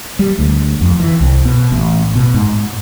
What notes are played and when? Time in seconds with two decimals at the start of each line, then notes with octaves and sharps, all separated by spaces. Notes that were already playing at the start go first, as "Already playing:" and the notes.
0.19 G3
0.39 D2
0.81 F2
1.00 E3
1.21 C2
1.45 B2
1.72 A1
2.15 B2
2.34 G#2